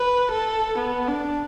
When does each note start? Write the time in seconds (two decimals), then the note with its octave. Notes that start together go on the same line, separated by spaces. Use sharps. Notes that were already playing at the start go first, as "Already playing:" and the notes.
Already playing: B4
0.31 A4
0.78 B3
1.09 D4